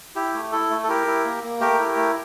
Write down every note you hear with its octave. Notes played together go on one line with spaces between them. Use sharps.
E4 G4
A3
E4 A4
A3
A4
E4 G4 A#4
E4
A#3
A#3
A3 G4 A#4
E4
A3